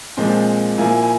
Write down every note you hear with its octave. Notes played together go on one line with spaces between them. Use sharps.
A#2 F3 G#3 C4 F4
A#2 F3 A#3 E4 G#5
G#5